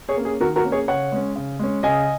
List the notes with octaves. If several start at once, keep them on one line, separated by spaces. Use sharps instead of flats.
G#4 C#5
A#3 C#4
G#4
D#3 F#4 A#4
F#4 A#4
A#3 C#4
G#4 C#5
C#3 C#5 F#5
G#3 C#4
C#3
G#3 C#4
C#3 D#5 G#5